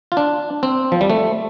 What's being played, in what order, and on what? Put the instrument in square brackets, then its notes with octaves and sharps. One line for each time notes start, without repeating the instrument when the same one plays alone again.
[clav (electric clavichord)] F4
D4
C4
F3
G3
A3